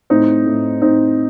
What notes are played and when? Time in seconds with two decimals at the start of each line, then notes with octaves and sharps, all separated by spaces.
0.10 A2 C4 D#4
0.46 A2
0.82 A2 C4 D#4